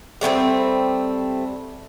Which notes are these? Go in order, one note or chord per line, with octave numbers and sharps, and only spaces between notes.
G3 A3 B3 C4